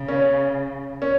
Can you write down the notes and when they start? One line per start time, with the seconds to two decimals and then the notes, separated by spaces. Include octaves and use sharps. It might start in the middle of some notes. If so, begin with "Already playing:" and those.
Already playing: C#3
0.08 C#4
1.02 C#4